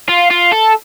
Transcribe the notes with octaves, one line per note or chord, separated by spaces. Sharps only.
F4
F4
A4